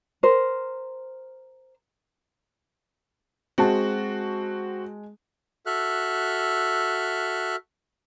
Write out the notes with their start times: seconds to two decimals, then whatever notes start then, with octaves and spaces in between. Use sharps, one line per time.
0.23 A#4 C5
3.58 G#3 C4 F#4 A5
5.66 F#4 A4 E5 F6 F#6